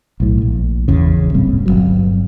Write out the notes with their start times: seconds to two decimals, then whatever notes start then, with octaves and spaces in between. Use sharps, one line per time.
0.20 B1 A2
0.42 A#1
0.88 G#1 E2 C#3
1.34 D1 A#2 G3 C4
1.66 G1 C#2 F#3